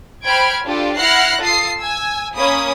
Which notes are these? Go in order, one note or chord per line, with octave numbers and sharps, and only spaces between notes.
C5 G5 B5 F6 G#6 D7
D4 F4 G4 A4 D5
E4 F#5 F6 F#6 A#6 C7
F4 A4 D#6 C7
G#5 E6
A#3 C#4 B5 D#6